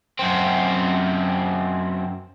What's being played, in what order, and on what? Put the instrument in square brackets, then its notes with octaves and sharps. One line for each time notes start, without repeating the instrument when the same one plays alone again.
[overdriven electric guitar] F#2 C4